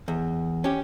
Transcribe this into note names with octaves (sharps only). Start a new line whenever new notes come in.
E2
C#4 G4